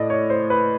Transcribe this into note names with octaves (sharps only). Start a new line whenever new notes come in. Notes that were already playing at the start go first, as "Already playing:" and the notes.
Already playing: A2 D5 D#5
C#5
C5
B4